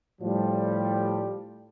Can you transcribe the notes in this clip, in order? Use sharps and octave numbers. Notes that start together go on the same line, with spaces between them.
A2 F3 G3